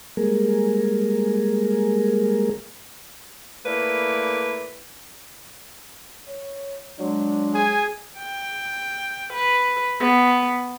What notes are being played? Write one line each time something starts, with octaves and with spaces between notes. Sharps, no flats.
G3 G#3 A#3 G#4 A#4
A3 A#3 E4 B4 D5
C#5
F#3 G#3 D4
G#4 G#5
G5
B4
B3